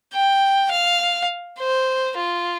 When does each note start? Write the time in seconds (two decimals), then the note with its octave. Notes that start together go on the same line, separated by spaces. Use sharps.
0.13 G5
0.72 F5
1.59 C5
2.17 F4